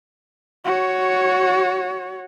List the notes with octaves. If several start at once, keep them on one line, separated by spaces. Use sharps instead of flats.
F#4 C#5